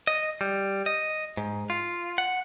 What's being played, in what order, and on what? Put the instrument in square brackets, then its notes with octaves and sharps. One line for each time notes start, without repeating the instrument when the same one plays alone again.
[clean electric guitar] D#5
G3
D#5
G#2
F4
F#5